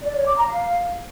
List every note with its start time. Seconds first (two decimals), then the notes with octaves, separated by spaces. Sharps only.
0.03 D5
0.14 C#5
0.26 D6
0.37 A#5
0.48 F5